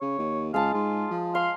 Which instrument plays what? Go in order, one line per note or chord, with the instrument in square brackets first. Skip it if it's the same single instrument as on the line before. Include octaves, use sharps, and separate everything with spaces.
[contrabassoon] C#3 [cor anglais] C#5
[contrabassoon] D#2
[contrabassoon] C#2 [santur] G#3 A5 [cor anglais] F5
[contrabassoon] G#2 [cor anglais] F4
[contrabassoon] F3
[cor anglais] F5 [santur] C6